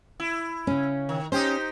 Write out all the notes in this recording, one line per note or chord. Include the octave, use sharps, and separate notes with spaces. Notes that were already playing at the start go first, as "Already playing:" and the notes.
E4
C#3 C#4
D#3
C#4 D#4 G4 C5